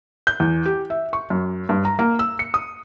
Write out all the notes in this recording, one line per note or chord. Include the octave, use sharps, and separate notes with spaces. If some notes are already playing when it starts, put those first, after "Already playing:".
G6
E2
G4
E5
C#6
F#2
G2
A#5
A#3
E6
C#7
D#6